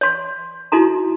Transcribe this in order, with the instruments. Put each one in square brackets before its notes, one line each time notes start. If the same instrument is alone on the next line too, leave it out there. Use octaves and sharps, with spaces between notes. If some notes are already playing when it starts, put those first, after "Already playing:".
[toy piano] C#5 C6
D#4 E4 F#4 A4 A#5 C6